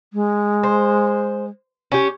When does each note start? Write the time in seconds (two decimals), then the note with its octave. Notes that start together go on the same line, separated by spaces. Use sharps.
0.13 G#3
0.63 C5
1.92 C#4 G4